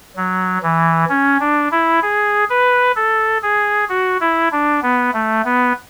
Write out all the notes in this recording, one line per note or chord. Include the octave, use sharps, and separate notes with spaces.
F#3
E3
C#4
D4
E4
G#4
B4
A4
G#4
F#4
E4
D4
B3
A3
B3